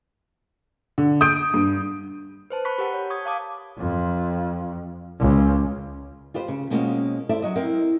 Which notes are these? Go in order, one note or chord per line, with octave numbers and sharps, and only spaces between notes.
D3
D#6 G6 D7
G2
B4 C5 A5
A5 B5 C#6 F#6 B6
G4 A#4 F#5 A5
C#5
C#6 D#6 G#6
F5 A5 D6 D#6
F2
C#2
F4 G4 B4 C5
C#3
B2 G#3 A#3 C4 C#4 F4
E4 A4 C5 D5 E5
F#3 F#4 D#5
C4 E4 A#4